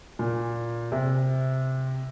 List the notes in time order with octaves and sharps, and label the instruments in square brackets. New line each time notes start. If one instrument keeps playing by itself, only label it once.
[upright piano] A#2
C3